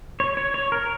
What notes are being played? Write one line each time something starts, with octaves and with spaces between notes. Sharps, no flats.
C#5
C#5
C#5
A#4